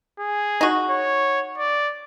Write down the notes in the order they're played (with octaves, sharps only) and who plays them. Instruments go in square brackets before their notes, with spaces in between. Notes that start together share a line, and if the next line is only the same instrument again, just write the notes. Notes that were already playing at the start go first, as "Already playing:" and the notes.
[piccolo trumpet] G#4
[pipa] D#4 F#4
[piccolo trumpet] C#5
D5